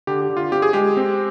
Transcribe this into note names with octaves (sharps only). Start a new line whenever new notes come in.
D3 G4
G4
D3
F4
C4 G4
G#4
G#3 G4
C4